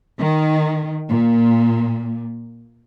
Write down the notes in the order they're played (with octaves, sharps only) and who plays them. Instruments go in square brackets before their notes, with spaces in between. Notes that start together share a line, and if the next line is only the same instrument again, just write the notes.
[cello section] D#3
A#2